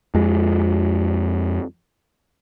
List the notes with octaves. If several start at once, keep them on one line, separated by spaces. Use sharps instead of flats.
F2 G#3